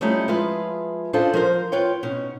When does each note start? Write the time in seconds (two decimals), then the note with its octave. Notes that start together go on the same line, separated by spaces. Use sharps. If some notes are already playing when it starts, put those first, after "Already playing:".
0.01 F3 G3 A3 C#4 D#4 E4
0.28 F3 G#3 F4 G#4 B4 E5
1.13 C#4 D4 F4 A4 C5 D#5
1.33 F3 A#4 C5
1.72 F4 B4 C#5 G5
2.03 B2 C#4 D#4